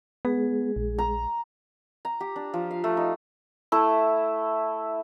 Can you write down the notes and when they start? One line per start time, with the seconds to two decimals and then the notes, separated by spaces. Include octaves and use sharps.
0.25 G#3 B3 G#4
0.76 A#1
0.99 A#5
2.05 A#5
2.20 G4
2.36 D4
2.54 F3
2.71 F5
2.84 A3
2.97 D#4
3.72 A3 E4